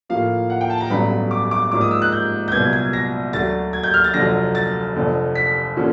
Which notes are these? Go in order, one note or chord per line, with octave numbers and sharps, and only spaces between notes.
A2 F3 A#3 F5
F#5
G5
A5
A#5
A1 G2 D3 F#3 B3 B5
D6
D6
G#2 F3 A#3 D4 D6
D#6
E6
F#6
G6
G6
C2 A#2 F#3 B3 G#6
G#6
A#6
D2 D3 F#3 A6
G#6
G6
F6
A6
F1 F2 D3 F#3 A#6
A6
F1 F2 D3
B6
D3 F3 A#3 C#4